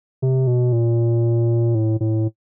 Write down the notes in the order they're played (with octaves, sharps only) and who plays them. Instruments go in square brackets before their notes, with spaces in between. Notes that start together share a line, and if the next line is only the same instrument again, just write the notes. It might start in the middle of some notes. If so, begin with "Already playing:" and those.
[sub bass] C3
B2
A#2
A2
A2